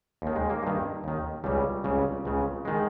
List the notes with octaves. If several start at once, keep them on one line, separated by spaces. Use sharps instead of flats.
D#2 D#3
G#3
A#3
G2 D#3
D#2 D#3
C#2 C#3 G3
C#2 C#3
C#2 C#3
D#3 G#3